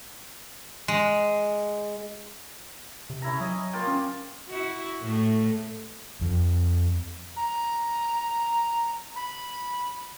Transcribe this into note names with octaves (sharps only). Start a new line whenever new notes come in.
G#3
C3
C#4 E4 A#5
F#3 D#5
A#3 F4 G5
C#4
E4 F#4
A2 A3
F2
A#5
B5